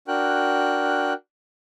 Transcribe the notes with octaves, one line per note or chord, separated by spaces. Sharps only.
D4 F#4 A#4 G5 F#6